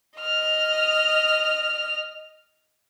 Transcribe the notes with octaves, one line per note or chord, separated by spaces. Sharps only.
D#5 F6